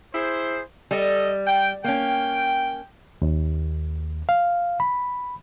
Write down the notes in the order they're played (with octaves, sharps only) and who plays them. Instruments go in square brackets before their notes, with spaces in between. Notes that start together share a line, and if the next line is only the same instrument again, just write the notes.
[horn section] E4 G#4 C5
[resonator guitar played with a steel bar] G3 [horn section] A4 D#5
[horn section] G5
[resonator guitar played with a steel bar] A#3 C#4 [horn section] G5
[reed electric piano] D#2
F5
B5